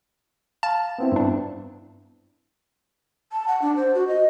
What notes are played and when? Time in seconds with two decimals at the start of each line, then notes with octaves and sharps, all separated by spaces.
0.63 F5 A5
0.98 B3 C4 E4
1.12 G2 D4
3.32 A5
3.48 F#5
3.62 D4
3.76 C5
3.95 F#4
4.08 D#5